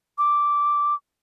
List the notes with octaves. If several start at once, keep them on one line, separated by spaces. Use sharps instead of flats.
D6